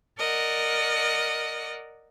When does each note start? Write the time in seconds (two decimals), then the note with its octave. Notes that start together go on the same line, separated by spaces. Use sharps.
0.17 A#4 D5 D#5 F#5